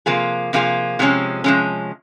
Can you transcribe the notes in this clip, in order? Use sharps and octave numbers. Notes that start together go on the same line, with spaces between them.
C3 F3 A#3 F4 G#4
C3 F3 A#3 F4 G#4
C3 F3 G#3 C#4
C3 F3 G#3 C#4